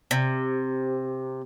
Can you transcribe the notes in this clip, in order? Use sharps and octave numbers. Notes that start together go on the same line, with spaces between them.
C3